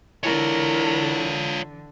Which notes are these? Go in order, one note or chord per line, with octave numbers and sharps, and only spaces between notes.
D3 E3 E4 F4 A#4 C#5